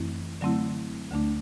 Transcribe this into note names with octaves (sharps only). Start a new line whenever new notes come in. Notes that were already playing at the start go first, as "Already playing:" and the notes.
Already playing: F#2 E3 A3 C4 E4
D3 F#3 A3 C4 E4
D2 D3 A3 D4